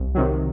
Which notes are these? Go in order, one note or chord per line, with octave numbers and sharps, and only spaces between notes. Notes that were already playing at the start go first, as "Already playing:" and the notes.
Already playing: C2
C3 D#3 F#3